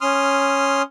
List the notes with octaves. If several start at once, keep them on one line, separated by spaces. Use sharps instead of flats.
C#4 C6 D#6 F6